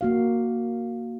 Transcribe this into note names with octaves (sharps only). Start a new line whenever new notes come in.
A#3 F#4 F5